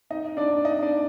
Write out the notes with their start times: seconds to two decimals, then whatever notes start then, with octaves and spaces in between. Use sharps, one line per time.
0.10 D#4 D#5
0.37 D4 D5
0.65 D#4 D#5
0.82 D4 D5